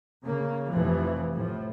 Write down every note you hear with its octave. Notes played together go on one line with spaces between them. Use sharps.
C#3 A#3
F1 E3 F3
A2 F3